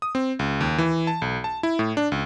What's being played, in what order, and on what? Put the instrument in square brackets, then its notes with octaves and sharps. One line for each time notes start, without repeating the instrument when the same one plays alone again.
[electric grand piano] D#6
C4
C#2
D#2
E3
A5
B1
A5
E4
A2
D4
C#2